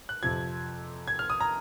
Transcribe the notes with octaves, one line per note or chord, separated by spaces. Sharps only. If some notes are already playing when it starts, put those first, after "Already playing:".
F#6
F2 C3 F3 G#6
G#6
F6
D#6
A#5